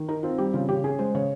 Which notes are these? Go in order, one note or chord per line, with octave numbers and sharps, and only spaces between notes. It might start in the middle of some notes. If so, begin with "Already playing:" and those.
Already playing: D#3
D#4 A#4
C4 F4
G3 G4
C#3 F4
C#3 G4
C#4 G#4
G#3 C5
C#3 C#5